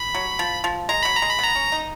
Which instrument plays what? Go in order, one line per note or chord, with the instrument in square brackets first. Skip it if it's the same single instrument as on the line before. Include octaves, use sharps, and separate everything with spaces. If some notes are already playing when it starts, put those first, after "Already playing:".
Already playing: [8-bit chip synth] B5
[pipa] F#3
F3
F3
[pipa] G#3 [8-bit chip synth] A#5
[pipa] F#3 [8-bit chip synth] B5
[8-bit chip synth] A#5
[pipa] G#3
[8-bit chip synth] B5
[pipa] B3 [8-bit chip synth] A#5
[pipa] C#4
D#4